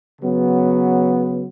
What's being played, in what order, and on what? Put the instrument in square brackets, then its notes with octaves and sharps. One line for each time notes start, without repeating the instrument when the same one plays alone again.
[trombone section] C#3 F#3 B3